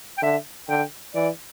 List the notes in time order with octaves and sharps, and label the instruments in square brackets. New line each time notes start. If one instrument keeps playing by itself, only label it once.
[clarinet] G5
[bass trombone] D3 [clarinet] E5
[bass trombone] D3 [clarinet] G5
[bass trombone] E3 [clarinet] D5